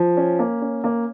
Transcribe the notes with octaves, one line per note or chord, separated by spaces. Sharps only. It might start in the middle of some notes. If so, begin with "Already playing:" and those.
Already playing: F3
C#4
A#3
C#4
A#3